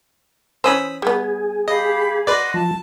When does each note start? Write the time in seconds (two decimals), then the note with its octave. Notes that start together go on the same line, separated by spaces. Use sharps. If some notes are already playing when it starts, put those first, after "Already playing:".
0.64 E3 C#4 C5 B5 D#6 E6
1.02 G3 B3 G#4
1.68 G4 D#5 F5 B5
2.27 F#4 B4 D5 D#5 C6
2.54 F3 A5